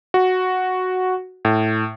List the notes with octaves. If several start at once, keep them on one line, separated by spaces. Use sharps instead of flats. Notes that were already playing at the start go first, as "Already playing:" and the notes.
F#4
A2